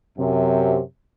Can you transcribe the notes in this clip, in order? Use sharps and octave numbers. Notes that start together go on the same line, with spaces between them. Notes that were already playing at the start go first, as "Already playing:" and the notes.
F#2 C3